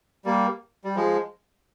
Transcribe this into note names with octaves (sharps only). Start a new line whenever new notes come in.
G3 A#3
G3
F3 G#3